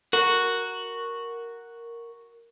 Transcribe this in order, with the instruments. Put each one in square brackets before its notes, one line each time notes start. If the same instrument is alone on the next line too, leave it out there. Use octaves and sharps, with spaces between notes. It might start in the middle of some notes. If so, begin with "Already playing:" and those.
[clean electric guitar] F#4 [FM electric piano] A#4